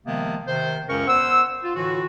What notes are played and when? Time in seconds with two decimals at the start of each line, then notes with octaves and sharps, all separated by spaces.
0.07 C3 D#3 F3 G#3 A#3 B3
0.47 C3 D#3 C5
0.89 C#2 F#2 C#3 C#4 A#4 C#6
1.08 E2 C5 F#5 E6
1.64 F4
1.76 A2 D3 E3 F4 F#4